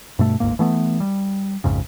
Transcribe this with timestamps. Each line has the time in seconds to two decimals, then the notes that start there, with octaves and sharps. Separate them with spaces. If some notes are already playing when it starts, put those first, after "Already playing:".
0.19 G2 B2 A3
0.40 D1 G1 G#2 A#3
0.59 E3 A3 B3
1.00 G3
1.64 A#1 F2 G#2 C#3